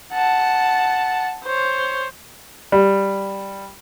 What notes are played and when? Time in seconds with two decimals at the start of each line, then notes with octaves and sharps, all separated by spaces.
0.13 F#5 A5
1.44 C5 C#5
2.72 G3